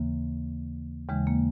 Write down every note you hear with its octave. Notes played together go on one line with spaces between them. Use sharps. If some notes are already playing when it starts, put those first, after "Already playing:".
Already playing: D#2 C#3 E3 A#3
D#2 C#3 E3 G#3
A#3